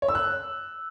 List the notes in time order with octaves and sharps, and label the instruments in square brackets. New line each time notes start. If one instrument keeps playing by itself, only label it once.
[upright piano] C#5
E6
F#6